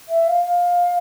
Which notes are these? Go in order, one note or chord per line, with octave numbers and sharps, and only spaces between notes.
E5
F5
F5